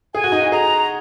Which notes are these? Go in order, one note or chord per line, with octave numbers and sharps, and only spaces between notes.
G#4 G#5
F#4
D#4
F#4
G#4 A#5